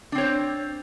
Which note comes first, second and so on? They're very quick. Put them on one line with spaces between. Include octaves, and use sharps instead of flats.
D4 C4 C#5 C5